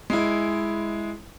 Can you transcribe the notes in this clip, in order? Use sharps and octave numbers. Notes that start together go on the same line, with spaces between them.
G#3 E4